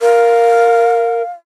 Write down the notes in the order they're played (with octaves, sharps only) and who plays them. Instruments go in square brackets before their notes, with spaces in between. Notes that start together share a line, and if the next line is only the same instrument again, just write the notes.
[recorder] A#4 [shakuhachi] F5